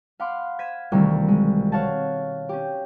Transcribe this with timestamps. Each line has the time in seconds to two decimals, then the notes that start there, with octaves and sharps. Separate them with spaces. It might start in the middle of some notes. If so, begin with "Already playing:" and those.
0.20 F5 F#5 B5 C6 D6
0.59 G#6 B6 D#7 E7
0.92 C2 B2 D#3 E3 G3 A3
1.28 G#3
1.72 C#5 F5 F#5 A5
2.49 C#4 G4